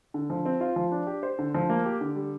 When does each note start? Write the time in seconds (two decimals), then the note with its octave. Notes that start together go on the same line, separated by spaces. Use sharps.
0.14 D3
0.30 F3
0.45 C4
0.60 F4
0.76 F3
0.92 D4
1.07 G4
1.23 C5
1.39 D3
1.55 F3
1.70 A#3
1.85 G4
2.01 D3
2.16 G3